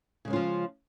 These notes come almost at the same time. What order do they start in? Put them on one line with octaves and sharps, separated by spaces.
C#3 G#3 C#4 F4 F3